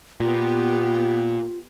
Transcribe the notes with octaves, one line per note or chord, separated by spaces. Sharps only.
A#2 B3 F4 G4